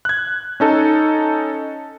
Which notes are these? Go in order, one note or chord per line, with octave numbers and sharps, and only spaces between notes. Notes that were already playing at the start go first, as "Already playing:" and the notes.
F#6 G#6
C#4 D#4 A4